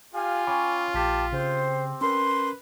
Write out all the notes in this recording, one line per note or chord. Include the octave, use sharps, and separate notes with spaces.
F4 G4 F5 G#5
C#4 C#5 G5 B5 D6
A#1 G4 A5 B6
C#3 C4 G4 C5
C#4 A#4 B4 C6